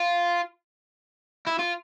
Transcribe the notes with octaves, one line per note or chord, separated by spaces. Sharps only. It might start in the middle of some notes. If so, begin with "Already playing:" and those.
Already playing: F4
E4
F4